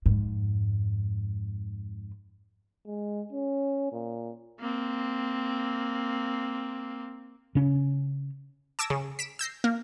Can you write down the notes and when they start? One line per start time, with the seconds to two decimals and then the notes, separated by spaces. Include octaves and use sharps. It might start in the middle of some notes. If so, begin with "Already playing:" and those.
0.06 F2 G#2
2.86 G#3
3.33 C#4
3.92 A#2
4.59 A#3 C4
7.55 C#3 C#4
8.79 A5 D6 E6 G#6 A#6
8.90 C#3
9.19 B6 D7 E7
9.39 E6 G6 A#6 C7
9.64 A#3